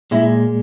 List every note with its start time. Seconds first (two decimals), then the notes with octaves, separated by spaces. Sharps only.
0.11 A#2 G#3 E4